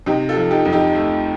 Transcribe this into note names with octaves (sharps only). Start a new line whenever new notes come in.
C3 D#4 G4
F4 A4
F3
D#4 G4
F2
D#4 G4
A3